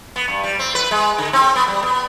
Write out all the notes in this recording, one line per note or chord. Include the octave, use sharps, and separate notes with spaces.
B3
G2
G3
C4
B4
G#3
D3
C4
B3
G3
B3